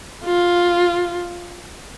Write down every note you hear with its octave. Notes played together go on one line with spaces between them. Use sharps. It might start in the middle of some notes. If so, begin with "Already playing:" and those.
F4